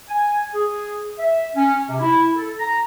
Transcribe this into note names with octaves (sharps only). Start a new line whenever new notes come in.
G#5
G#4
E5
C#4
C3
E4
A4
A#5